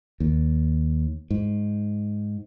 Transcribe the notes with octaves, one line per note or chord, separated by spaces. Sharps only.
D#2
G#2